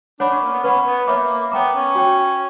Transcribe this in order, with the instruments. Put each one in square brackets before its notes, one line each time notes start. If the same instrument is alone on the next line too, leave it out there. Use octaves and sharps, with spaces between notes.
[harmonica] D4 [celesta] C#5 F#5 B5 D6
[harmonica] C#4
A#3
B3
[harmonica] C#4 [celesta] B4 F#5 B5
[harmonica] B3
[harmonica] A#3 [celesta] C#5 E5 B5 D6
[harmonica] A#3
[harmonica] B3 [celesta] C#5 G5 A#5 D6
[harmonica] C#4
[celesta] F#4 C#5 G5